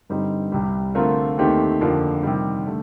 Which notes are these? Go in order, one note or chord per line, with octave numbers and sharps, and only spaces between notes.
G2 D3 G3 C4 D#4
C2 C3 G3
D3 A3 C4 F4 A#4
D#2 D#3 A3 C4 G4
F2 D3 F3 A#3
C3 D#3 G3
D3 A3